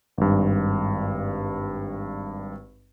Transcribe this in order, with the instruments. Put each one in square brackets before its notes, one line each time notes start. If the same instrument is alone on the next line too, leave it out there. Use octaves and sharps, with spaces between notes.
[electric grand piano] G#1 G2